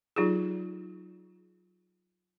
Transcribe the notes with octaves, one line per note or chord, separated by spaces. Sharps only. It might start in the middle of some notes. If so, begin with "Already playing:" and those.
F#3 D#4 F4 G4 G#4